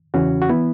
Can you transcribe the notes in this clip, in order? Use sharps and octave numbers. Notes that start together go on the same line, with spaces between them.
E2 C#3 E3 C#4 F#4
F#4
E3 B3 E4